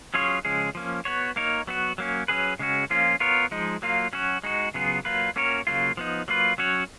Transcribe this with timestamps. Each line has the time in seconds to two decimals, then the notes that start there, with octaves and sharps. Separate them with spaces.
0.14 F#3 C#4 F4 G#4 C#5
0.45 C#3 F3 G#3 C#4 G#4
0.75 F3 A#3 C#4
1.05 B3 F#4 C#5
1.36 A#3 D#4 A#4 C#5
1.67 F#3 B3 F#4
1.98 F#3 A#3 C#4
2.28 F#3 C#4 G#4 B4
2.59 C#3 G#3 C#4 F#4
2.90 F3 A#3 C#4 F4
3.20 B3 F4 A#4 C#5
3.51 F3 G#3 D#4
3.82 F#3 A#3 F4
4.13 F#3 C#4 F#4
4.44 G#3 D#4 F#4
4.74 C#3 F#3 B3 F4 G#4
5.05 F#3 A#3 F4 B4
5.36 A#3 C#4 F#4 A#4 C#5
5.67 C#3 F#3 A#3 F4
5.97 F3 B3 D#4
6.28 F#3 A#3 F4 B4
6.58 F#3 C#4 F#4 C#5